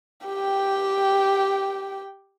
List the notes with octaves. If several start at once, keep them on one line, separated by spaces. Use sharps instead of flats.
G4 G5